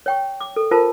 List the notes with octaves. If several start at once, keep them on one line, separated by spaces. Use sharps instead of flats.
C#5 G5 C#6
D6
A4
F4 A#4 C5 A5